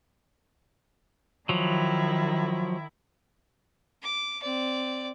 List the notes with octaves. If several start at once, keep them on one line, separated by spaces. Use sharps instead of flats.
D#3 F3 F#3 E4
D6
C4 D5